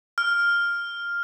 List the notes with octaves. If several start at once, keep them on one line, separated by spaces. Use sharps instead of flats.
F6